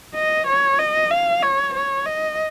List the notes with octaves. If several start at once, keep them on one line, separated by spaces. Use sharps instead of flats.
D#5
C#5
D#5
F5
C#5
C#5
D#5